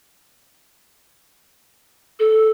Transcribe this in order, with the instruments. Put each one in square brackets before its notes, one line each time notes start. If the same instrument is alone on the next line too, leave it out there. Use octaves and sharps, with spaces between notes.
[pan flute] A4